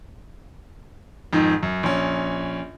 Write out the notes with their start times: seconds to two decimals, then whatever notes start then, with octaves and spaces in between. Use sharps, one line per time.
1.33 F2 G#2 D#3
1.63 F#2
1.83 A#1 C#4